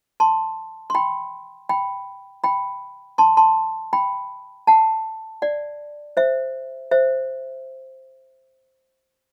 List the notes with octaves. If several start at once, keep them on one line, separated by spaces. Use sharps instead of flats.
A5 C6
C6
G5 B5
G5 B5
G5 B5
A5 C6
A5 C6
G5 B5
F#5 A5
D5 F#5
C5 E5
C5 E5